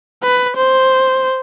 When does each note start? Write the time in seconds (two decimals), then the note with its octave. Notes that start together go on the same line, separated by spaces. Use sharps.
0.23 B4
0.56 C5